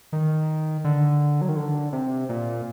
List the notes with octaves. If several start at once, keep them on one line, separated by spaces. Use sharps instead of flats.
D#3
D3
F#3
D#3
D3
C3
A#2